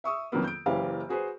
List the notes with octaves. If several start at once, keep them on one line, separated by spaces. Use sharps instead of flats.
E5 C#6 D#6 E6
F2 D#3 F#3 A#3 B3
G6 D7
F#1 E3 A#3 C#4 G4 F5
F#4 G#4 B4 C5